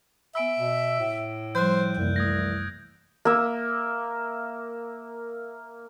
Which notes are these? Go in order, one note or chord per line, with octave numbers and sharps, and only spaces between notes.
B3 E5 G#5 B5 E6 D7
B2
A2
F3 G3 C5 F#6 G6
C2 F#2 C3 E3 A#3
A3 D#6 G#6 A#6
A#3 E5